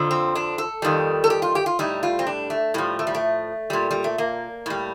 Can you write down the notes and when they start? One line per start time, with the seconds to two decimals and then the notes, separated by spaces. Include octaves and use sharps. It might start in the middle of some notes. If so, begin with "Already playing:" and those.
Already playing: F2 D3 F3
0.11 C4
0.35 D4
0.58 A4
0.82 F2 D#3 G3
1.24 A4
1.30 G4
1.42 F4
1.55 G4
1.66 F4
1.79 A2 G3 D#4
2.03 F4
2.19 C4
2.27 D4
2.50 A3
2.74 A2 F3 G3
2.99 A3
3.07 G3
3.15 A3
3.70 A#2 G3
3.91 G3
4.04 A3
4.18 A#3
4.66 A2 G3